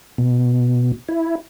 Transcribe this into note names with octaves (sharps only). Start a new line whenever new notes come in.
B2
E4